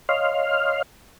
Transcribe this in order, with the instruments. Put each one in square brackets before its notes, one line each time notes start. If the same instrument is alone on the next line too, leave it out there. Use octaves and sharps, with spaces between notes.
[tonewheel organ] C#5 D#5 F5 C6 F6